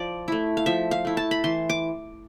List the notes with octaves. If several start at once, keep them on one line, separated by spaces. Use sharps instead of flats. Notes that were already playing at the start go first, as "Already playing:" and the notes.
Already playing: F3 D5
A3 E4
F5
F3 E5
F5
A3 E4
A5
B5
E3 C6
D6